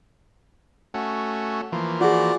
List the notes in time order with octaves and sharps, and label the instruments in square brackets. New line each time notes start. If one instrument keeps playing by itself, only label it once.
[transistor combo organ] A3 C#4 F#4
E3 F3 A#3
[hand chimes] F4 G#4 [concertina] F#4 D5